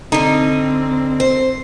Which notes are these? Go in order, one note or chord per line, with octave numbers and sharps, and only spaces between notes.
D3 G3 C4 D#4
C5